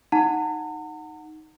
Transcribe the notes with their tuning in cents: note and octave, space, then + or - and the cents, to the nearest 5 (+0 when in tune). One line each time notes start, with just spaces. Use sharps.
D#4 +0 F#5 -5 A#5 -45